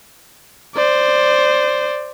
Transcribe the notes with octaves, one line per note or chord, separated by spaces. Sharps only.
C5 D5